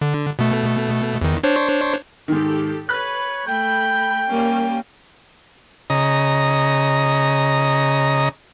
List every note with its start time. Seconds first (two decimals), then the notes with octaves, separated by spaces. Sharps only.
0.01 D3
0.39 B2 A3
1.21 E2 D#3
1.43 D4 C5 C#5
2.28 G#2 D#3 G4 A4
2.89 B4 C#5 B5 F#6
3.47 A3 G5 B5 G6
4.28 G3 A#3 C#4
5.90 C#3 D#5 A#5